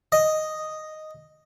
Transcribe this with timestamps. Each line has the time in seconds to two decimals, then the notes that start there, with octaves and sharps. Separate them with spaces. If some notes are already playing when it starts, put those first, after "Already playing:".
0.12 D#5